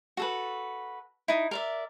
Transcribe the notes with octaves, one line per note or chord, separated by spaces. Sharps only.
F#4 A4 B4
D#4 E4
A#4 D5 E5